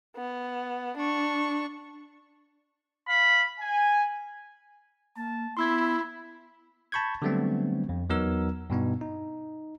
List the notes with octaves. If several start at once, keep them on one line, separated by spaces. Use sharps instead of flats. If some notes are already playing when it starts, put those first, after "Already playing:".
B3
D4 C#6
F5 B5
G#5
A#3 A5
B3 E4 B5 C6 E6 G#6
A5 B5 C#6 G6 G#6
D3 F#3 G3 A3 B3 C4
F2
E2 F#3 B3 D#4 A#4 E6
G2 B2 B3 D#4
D#4